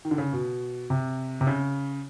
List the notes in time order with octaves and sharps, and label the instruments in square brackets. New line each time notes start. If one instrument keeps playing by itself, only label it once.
[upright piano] D#3
D3
C#3
B2
C3
C3
C#3